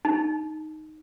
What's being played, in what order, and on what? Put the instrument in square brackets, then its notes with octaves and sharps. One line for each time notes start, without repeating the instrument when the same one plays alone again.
[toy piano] D#4